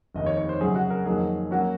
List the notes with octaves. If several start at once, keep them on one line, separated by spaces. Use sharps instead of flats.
F1 D#2 D#3 D#5
C#5
C#5
C5
F#2 C#3 F#3 C#4 G#4
F#4
A#4
F2 D#3 F#3 A#3 G#4
F#3 A#3 C#4 F#4